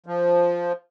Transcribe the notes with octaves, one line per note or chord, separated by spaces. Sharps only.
F3